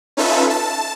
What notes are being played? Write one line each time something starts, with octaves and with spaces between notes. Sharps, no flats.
C#4 D#4 F4 A4 B4 E5
A5